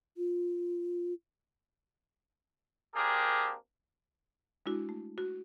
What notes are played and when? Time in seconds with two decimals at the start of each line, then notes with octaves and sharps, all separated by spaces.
0.17 F4
2.94 A#3 C4 D4 G4 G#4 A#4
4.66 G#3 D4 E4 F#4
4.89 A3
5.18 F#4